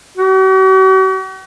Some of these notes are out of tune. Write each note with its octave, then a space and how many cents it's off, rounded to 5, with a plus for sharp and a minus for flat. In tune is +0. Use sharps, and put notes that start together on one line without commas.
F#4 +45